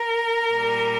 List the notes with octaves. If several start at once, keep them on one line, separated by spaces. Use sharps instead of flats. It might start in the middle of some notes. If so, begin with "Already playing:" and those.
Already playing: A#4
A#2 G3